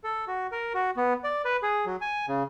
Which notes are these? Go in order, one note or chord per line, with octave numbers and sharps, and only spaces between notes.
A4
F#4
A#4
F#4
B3
D5
B4
G#4
F#3
G#5
C#3